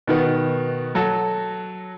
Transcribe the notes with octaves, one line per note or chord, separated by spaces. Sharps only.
B2 D#3 B3
F#3 F#4 A4